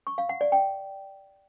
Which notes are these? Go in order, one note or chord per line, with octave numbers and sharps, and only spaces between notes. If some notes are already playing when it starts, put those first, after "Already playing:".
C#6
F5
F#5
D5
G5